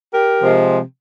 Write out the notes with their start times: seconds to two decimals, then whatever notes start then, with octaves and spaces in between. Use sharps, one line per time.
0.12 G4 A#4
0.40 C3 F3 G#3